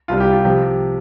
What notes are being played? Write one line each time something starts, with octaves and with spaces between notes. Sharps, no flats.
C2 C3 G3 F4
G4
F4
C3 F3 G4